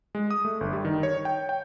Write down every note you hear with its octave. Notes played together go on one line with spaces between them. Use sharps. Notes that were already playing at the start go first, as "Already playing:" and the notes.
G#3
D#6
A3
G1
G3
D#3
C#5
G5
G5